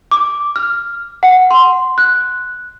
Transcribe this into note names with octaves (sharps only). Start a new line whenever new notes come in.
D6
F6
F#5
C6
F#6